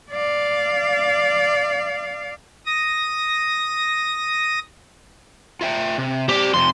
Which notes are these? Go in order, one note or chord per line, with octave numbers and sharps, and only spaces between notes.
D5 F5
D#6 A#6
F4 E5 G5
C3
C4 G4 D5
F2 C3 C6